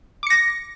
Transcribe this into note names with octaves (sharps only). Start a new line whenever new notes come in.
D6 A#6 C#7